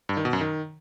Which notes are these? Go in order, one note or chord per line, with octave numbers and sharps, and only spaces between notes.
G2
D#3
B2
F#2
D#3